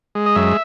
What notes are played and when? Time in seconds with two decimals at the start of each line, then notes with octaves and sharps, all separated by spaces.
0.15 G#3
0.26 D#5
0.35 F#2 E5